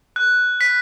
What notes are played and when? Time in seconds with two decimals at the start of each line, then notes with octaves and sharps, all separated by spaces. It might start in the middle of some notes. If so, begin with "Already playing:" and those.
0.16 F#6
0.61 B6